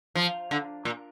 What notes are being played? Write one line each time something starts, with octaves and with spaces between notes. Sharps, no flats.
F3
D3
A#2